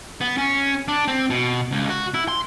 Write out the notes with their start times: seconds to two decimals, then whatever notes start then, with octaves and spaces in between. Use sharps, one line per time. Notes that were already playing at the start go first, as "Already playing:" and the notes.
0.21 B3
0.38 C#4
0.88 D4
1.08 C4
1.30 B2
1.71 C#2
1.90 F#4
2.14 E4
2.28 C6